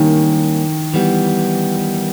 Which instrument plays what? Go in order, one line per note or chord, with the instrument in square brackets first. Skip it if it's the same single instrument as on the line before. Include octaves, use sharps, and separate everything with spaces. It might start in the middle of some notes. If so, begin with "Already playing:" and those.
Already playing: [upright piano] D#3 [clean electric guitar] G3 A#3 C#4
[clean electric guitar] E3 G3 B3